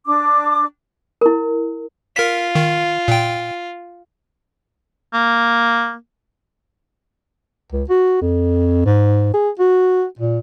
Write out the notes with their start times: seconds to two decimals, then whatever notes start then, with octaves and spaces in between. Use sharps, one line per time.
0.07 D4 D6
1.21 E4 A#4
2.16 F4 A#4 B6
2.55 D#3
3.08 A#2 G5
5.14 A#3
7.72 C#2
7.89 F#4
8.21 F2
8.85 G#2
9.34 G#4
9.59 F#4
10.19 A#2